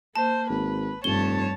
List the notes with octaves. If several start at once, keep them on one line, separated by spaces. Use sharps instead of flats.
A#3 C5 A5
G#1 B4
F1 G2 C#5 A5 G7